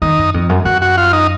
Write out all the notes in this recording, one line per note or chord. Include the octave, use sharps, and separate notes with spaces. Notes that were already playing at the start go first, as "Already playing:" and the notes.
D#3 D#4
F#2
F2
F#2
F#2 F#4
F#4
F4
D#4